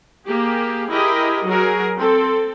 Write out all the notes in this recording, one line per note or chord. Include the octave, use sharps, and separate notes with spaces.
A#3 G4 G#4
E4 G4 G#4 A#4 D#5
F#3 F#4 G#4 A#4
C4 A4